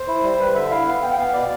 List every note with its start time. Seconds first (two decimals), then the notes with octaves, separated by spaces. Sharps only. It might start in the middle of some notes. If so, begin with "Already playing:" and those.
Already playing: C5
0.08 E4
0.23 G3
0.39 G3 B4
0.54 D3 E5
0.70 E4 F5
0.86 B3 F5
1.02 B3 G5
1.13 G5
1.18 B3 F5
1.33 B2 D5